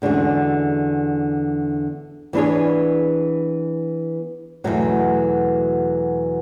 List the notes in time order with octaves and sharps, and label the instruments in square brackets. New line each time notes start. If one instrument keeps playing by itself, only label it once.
[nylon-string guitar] E2 D3 G#3 C#4 F#4
E3 B3 D4 G#4 C#5
E2 B2 F#3 A3